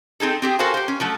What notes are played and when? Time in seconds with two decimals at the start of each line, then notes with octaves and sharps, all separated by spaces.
0.20 C4 D#4 G#4 A4
0.42 C4 G4 G#4
0.59 F#4 A4 A#4 C5 F5 G#5
0.74 G4 C5
0.88 C#4
1.00 F3 F#3 A3